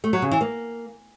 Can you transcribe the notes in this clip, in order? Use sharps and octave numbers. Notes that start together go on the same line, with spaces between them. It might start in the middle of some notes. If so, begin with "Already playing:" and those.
A3
F#3
C#3
E3
A#3